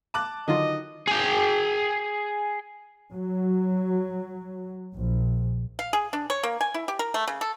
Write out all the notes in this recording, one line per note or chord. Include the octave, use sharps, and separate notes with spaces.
A5 D6 F#6
D3 D#3 F#3 F4 F#4 D#5
G#4 G5
F#3
A#1
F5
G#4
D4
C#5
A#3
G#5
E4
G4
A#4
A3
C#3
A4